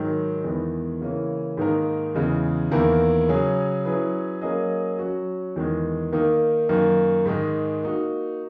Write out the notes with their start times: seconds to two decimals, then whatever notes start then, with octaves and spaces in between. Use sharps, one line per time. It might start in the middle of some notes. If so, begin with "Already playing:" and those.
Already playing: G#2 D#3 F#3
0.44 E2 D#3 G#3 B3
1.01 C#3 E3 A#3 C#4
1.57 G#2 D#3 A#3 D#4 A#4
2.14 E2 C#3 G#3
2.71 E2 D#3 A#3 E4 A#4
3.29 C#3 F#3 C#4 G#4
3.85 F#3 C#4 E4 G#4 B4
4.41 F#3 A#3 C#4 G#4 D#5
4.99 F#3 C#4 F#4
5.56 E2 D#3 G#3
6.12 D#3 A#3 D#4
6.69 F#2 D#3 A#3
7.26 G#2 D#3 G#3
7.83 A#3 D#4 F#4